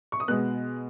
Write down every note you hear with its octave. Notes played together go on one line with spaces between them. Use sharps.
C#6
D#6
B2 G#3 B3 F#6